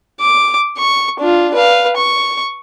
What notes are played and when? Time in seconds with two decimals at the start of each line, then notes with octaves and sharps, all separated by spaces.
0.20 D6
0.77 C#6
1.19 D4 F4
1.54 B4 F5
1.96 C#6